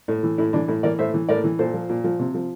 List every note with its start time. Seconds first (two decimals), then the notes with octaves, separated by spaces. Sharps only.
0.08 A2
0.23 E3
0.38 A2 E4
0.53 E3 D4
0.68 A2 E4
0.83 E3 A#4 D5
0.99 A2 C5 E5
1.14 E3
1.29 A2 A#4 D5
1.44 E3
1.59 A#2 A4 C5
1.74 F3
1.89 A#2
2.04 F3
2.19 C3
2.34 F3